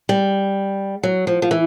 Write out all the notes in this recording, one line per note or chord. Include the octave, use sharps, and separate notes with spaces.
G3
F#3
F3
F3
E3